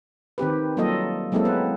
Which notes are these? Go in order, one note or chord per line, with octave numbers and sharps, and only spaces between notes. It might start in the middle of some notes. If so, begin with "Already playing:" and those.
D#3 C4 G4 B4
F#3 G3 A#3 F4 A4 D#5
F#3 G#3 A#3 C4 E4 A4
B3 B4